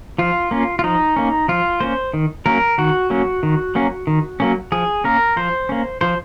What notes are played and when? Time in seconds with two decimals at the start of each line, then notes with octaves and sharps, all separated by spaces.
0.18 F3 F4
0.51 A#3 C#4
0.79 F4
0.84 F3 D#4
1.16 A#3 C#4
1.48 F3 F4
1.81 A#3 C#4 C5
2.14 D#3
2.46 F#3 A#3 C#4 A#4
2.78 D#3 F#4
3.10 F#3 A#3 C#4
3.43 D#3
3.75 F#3 A#3 C#4
4.07 D#3
4.40 F#3 A#3 C#4
4.72 F3 G#4
5.04 A#3 C#4 A#4
5.37 F3 C5
5.69 A#3 C#4
6.01 F3 C5